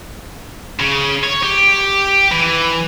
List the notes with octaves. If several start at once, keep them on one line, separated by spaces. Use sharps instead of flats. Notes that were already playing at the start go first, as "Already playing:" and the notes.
C#3
C#5
G4
E3